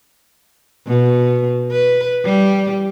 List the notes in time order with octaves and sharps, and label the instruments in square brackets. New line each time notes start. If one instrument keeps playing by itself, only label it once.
[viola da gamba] B2
B4
G3